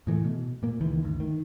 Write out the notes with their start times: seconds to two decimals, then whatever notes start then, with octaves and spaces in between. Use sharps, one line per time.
0.07 A2 E3 G#3 A3
0.24 B2
0.63 A#2 A#3
0.81 C#2 D#3 E3
1.03 G1 D2
1.20 D#3